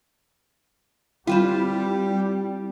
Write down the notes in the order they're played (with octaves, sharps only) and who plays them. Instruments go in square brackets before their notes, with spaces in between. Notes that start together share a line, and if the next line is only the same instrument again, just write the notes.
[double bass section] G3 [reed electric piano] C4 E4 [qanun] F4 B4 C5 [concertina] G4